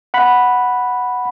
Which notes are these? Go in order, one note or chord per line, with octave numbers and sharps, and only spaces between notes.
F#5 B5